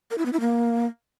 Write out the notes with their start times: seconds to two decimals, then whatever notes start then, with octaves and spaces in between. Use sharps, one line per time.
0.11 A#4
0.18 E4
0.25 B3
0.33 E4
0.40 A#3